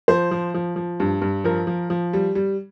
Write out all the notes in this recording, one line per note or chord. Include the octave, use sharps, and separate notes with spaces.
F3 C5
F3
F3
F3
G2
G2
F3 A#4
F3
F3
G3
G3